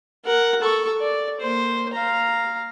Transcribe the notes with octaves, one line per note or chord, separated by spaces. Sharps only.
A#4 F#5
A4 C#6
D5
A#3 C5
F5 A#5